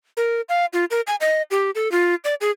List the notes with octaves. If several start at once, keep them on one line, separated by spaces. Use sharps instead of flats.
A#4
F5
F4
A#4
G#5
D#5
G4
A4
F4
D5
G#4